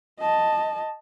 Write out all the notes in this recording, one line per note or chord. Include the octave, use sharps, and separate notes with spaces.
D#5 A5